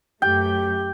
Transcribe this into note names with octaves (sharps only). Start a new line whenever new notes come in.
F#2 A3 G4 G5